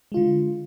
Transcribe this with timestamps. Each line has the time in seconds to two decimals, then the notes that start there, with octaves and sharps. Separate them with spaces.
0.12 G#3
0.14 F4
0.17 D3